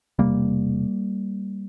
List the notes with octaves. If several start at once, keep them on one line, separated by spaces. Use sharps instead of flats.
E1 E2 C3 G3 A#3